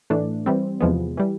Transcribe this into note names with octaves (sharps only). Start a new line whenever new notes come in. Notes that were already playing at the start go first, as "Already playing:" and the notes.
A2 E3 A3 D4
E3 G3 C4
E2 C3 F3 G#3 B3
E3 G3